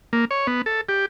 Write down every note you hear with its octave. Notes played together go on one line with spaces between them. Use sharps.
A#3
C#5
B3
A4
G4